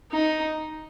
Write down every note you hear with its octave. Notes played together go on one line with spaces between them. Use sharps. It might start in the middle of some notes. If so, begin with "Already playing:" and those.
D#4